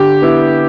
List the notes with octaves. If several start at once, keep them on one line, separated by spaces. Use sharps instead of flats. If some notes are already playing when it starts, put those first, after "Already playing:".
Already playing: D3 G4
B3 E4